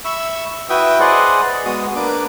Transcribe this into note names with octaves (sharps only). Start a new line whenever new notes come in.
E5 B5 C#6 E6
E4 F#4 B4 E5 G5 D#6
G#4 B4 C5 D5 D#5 F#5
G#3 B3 F#4 D#6
A#3 D4 B4 D6